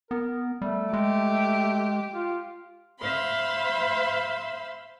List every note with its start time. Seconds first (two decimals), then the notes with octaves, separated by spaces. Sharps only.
0.11 B3 A#4
0.62 G3 A3
0.93 G#3 G4
2.14 F4
3.00 C5 E5 F5 B5 C6